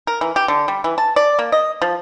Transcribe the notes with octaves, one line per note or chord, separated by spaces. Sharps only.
A#4
E3
G4
D3
G3
E3
A5
D5
A#3
D#5
F3